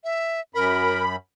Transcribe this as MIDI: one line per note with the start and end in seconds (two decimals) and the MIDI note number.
0.04 0.41 76
0.55 1.16 42
0.55 1.03 70
0.55 1.16 83